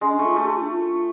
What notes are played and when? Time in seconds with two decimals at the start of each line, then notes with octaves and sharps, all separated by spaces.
0.01 G#3 C#4
0.14 D4
0.19 A3
0.25 F4
0.36 A3 F#4
0.45 G#4
0.53 F#4
0.57 F4
0.62 D4
0.71 F4